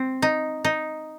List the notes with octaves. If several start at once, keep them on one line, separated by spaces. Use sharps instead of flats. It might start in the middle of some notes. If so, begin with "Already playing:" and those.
Already playing: C4
D#4
D#4